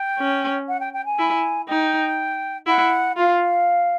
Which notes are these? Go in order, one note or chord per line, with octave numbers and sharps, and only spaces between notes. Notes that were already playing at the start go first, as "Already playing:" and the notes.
Already playing: G5
C#4
F#5
G5
G5
G#5
E4
D#4 G5
E4 F#5
F4 F5